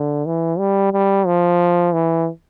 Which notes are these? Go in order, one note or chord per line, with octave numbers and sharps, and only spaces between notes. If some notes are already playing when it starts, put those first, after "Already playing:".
Already playing: D3
E3
G3
G3
F3
E3